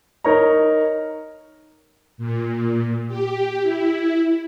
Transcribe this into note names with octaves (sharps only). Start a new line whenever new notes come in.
D#4 A#4 C#5 D#5 A#5
A#2
G4
E4